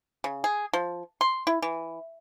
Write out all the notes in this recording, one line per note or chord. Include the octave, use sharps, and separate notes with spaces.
C#3
G#4
F3
C6
E4
E3